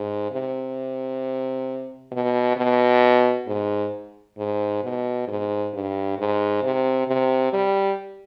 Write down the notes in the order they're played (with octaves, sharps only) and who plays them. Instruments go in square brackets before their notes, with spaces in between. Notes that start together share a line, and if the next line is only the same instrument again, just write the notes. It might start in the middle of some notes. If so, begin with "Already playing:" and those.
Already playing: [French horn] G#2
C3
B2
B2
G#2
G#2
B2
G#2
G2
G#2
C3
C3
G3